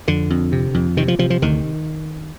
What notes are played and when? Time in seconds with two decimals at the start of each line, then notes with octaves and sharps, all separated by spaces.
0.08 F2 D3
0.30 F2
0.52 C3
0.74 F2
0.97 C3 D#3
1.08 F3
1.19 C3 F3
1.30 F3
1.42 D2 D#3